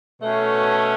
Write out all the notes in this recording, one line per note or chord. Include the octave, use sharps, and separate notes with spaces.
B2 A3 C#4